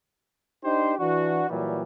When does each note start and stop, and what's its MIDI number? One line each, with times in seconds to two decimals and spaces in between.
0.64 0.94 62
0.64 0.94 63
0.64 0.94 67
0.64 0.94 72
0.99 1.45 52
0.99 1.45 62
0.99 1.45 66
1.50 1.81 46
1.50 1.81 52
1.50 1.81 54
1.50 1.81 55